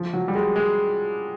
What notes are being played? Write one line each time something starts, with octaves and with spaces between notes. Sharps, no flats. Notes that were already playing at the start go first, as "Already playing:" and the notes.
Already playing: F3
F#3
G3
G#3
G#3